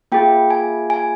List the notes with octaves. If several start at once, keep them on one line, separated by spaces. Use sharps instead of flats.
A#3 F4 G#4 G5
G#5
G#5